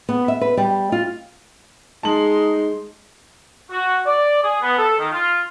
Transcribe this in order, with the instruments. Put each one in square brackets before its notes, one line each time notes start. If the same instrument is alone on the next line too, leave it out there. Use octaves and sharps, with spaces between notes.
[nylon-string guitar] B3
E5
B4
G3
F4
[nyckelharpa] G#3 C6 [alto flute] D#4 [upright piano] A5 F#7
[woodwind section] F#4
D5
G#4
B3
A4
D#3
F4